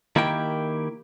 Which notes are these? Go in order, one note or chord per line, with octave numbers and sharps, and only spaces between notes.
D#3 A#3 E4 G4 G5